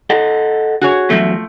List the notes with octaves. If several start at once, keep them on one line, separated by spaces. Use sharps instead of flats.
A4 D#5 F#5
F#4 G#4 C#5
E2 F3 F#3 A3